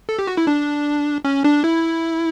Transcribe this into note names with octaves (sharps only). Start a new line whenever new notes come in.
A4
G4
F#4
E4
D4
C#4
D4
E4